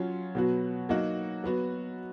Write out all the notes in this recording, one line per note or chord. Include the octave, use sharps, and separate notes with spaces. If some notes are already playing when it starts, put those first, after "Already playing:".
Already playing: F#3 C#4 F4
B2 F#3 B3 F#4
F#3 A#3 D#4 F#4
F#3 B3 F#4